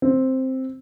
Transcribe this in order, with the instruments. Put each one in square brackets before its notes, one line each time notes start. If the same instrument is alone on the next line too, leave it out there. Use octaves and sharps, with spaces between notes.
[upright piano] C4